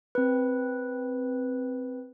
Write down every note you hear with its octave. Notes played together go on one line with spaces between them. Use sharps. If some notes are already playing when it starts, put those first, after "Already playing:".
C4 B4